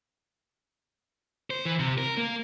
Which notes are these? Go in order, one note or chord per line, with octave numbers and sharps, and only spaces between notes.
C5
E3
C3
A#4
A#3